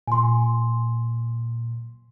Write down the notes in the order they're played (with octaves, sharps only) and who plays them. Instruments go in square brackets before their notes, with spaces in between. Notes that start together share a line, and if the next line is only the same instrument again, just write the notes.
[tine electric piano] A#2 [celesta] G#5 C6